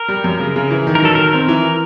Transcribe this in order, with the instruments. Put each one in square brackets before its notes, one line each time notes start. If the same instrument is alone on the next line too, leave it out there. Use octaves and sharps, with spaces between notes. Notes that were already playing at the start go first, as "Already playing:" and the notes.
Already playing: [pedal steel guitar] A#4
[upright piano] G3
F#2
C#3
C#3
E3
D#3
[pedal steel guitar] A#4
[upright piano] F#3 [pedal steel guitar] A4
[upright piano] D#3 [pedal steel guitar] A#4
[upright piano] C4 [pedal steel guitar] A#4
[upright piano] E3